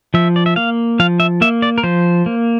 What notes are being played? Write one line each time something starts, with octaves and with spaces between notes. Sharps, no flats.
F3 E5
D5
E5
A#3 F5
F3 F5
E5
A#3 E5
D5
A#4
F3 C5
A#3